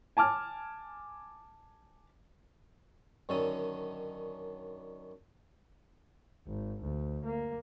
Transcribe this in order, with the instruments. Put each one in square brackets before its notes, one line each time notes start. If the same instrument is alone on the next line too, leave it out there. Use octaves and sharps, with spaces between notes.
[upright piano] G#5 A5 D6 F6
[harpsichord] F#2 D3 D#3 C#4 A4 D#6
[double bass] G#1
D2
A#3